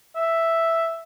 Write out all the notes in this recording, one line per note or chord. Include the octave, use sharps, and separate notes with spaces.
E5